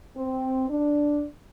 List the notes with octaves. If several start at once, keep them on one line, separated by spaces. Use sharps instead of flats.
C4
D4